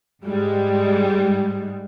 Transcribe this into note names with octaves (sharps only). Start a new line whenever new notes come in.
G#2 G3 G#3